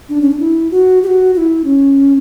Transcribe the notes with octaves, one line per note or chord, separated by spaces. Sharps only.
D4
C#4
D4
E4
F#4
G4
F#4
F#4
E4
C#4